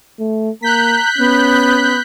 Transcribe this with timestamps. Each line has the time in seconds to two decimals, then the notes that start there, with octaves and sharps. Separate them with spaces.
0.19 A3
0.62 A#3 A#5 F#6 G6 B6
1.18 B3 C#4